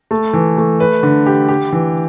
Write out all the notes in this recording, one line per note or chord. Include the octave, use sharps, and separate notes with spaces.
A3
E3
A3
B4
D3
G4
G4
E3